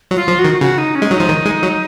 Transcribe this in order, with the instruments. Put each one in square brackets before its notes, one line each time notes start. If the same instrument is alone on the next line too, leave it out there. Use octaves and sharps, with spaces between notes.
[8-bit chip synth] F#3
[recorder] F4
[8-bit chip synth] F3
[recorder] F#4
[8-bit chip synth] D#3
[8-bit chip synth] C#3 [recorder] F#4
[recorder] D#4
C#4
[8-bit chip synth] G#3
[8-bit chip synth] F#3 [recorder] D#4
[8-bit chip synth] F3
D#3
G#3
F#3